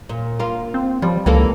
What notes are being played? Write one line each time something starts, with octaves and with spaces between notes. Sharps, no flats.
A#2
A#3 F4
C4
F3 G3
C#2 E3 A#3 A4